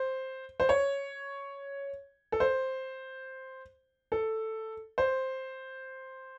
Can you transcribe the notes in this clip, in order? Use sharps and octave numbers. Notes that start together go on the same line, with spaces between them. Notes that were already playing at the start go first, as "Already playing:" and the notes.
Already playing: C5
C5
C#5
A4
C5
A4
C5